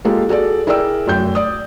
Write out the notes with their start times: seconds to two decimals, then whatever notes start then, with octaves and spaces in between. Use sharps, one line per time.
0.05 G#3 A#3 F4 G4 A4
0.29 F#4 G#4 A4 D5
0.67 E4 G#4 A#4 D5 G5 E6
1.07 F1 F#2 G5 G6
1.35 D5 D#6